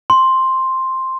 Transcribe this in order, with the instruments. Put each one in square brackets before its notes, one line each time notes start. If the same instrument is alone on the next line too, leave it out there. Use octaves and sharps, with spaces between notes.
[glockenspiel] C6